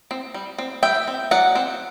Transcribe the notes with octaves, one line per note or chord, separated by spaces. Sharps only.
C4
G3
C4
G3 E5 G5
C4
F#3 D5 F#5
C4